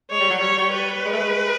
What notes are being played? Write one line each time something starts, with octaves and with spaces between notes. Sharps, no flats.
G#3 C#5
G3
F#3
G3 C#5
G3
B4
G#3
A3
G#3